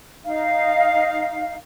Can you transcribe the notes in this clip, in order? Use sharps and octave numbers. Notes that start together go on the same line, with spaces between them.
D#4 F5